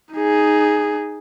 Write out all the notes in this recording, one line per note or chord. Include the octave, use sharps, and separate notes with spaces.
D#4 G#4